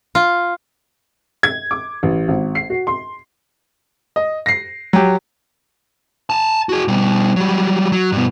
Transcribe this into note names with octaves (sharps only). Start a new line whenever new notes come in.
F4
G#6
D6
A1
G#1
C7
F#4
C6
D#5
A#6 C7
F#3 G4
G#5 A5
F#4 G#4
B2 G3
F#3 G3
F#3
G2 B2